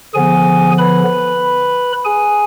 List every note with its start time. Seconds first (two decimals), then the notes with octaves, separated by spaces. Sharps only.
0.14 D3 F3 B3 G#4 G#5
0.78 B4 B5
2.05 G#4 G#5